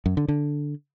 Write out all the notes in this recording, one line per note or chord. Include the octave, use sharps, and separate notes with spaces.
F#2
D3
D3